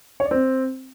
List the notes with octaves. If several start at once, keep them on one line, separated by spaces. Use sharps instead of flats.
C#5
D5
C4